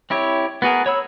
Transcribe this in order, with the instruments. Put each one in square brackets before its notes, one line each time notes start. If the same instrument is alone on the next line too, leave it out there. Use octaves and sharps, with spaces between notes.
[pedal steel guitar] C4 E4 G4 C#5
B3 F#4 G#4 A#4
C#5 B5 E6